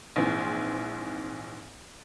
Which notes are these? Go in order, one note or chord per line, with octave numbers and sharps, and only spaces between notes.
A#1 G#2 E3 C4